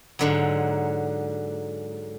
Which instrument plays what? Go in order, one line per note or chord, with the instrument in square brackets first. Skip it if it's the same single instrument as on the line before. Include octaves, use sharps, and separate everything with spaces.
[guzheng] G#2 D3 F#3